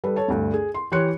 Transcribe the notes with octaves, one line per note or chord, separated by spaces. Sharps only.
G3 A4 B4
A4 C#5 A5
D2 G2
G#4
C6
E3 G4 C#5 C6 F#6 C#7